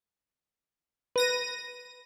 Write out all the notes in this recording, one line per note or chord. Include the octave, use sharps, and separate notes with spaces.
B4 A#6 D#7